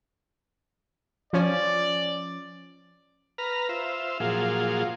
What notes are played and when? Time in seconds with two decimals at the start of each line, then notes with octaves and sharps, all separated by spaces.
1.33 F3 C#4 D5
3.38 B4 A#5 F6
3.69 F4 C5 E5
4.20 A#2 F3 F#3 F4 G#4